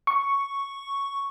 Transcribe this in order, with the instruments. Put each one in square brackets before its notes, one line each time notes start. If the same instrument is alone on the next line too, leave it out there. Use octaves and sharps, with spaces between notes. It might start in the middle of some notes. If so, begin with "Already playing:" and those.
[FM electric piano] C#6